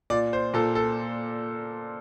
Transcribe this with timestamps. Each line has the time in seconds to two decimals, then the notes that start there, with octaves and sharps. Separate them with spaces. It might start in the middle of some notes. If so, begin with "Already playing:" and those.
0.10 A#2 D5
0.33 C5
0.54 A#2 A4
0.75 A4